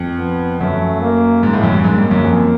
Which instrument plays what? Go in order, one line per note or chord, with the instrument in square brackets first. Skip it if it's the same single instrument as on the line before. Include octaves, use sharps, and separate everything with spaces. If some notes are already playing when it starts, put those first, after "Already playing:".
Already playing: [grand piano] F2
[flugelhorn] B3
[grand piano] F#2 [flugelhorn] A3
[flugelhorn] A#3
[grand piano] G#2
A2
F#2
G2
[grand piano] G#2 [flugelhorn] A#3
[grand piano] G2
F#2
F2